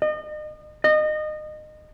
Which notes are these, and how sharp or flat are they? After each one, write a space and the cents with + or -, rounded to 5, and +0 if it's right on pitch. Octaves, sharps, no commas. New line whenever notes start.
D#5 -35
D#5 -25